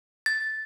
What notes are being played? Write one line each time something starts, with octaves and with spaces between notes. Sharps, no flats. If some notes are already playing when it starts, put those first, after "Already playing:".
A6